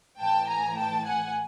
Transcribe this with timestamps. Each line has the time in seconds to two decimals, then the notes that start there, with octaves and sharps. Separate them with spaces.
0.19 A2 E3 G5 A5
0.48 G#5 A#5
0.77 G5 A5
1.05 F#5 G#5